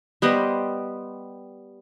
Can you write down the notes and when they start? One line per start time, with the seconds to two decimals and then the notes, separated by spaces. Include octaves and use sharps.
0.22 G3 B3 C5 D#5